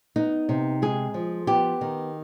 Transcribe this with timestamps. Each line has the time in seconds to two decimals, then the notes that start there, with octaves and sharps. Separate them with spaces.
0.16 B3 D#4
0.49 C3
0.82 G#3 G#4
1.14 F3
1.47 B3 G4
1.81 D#3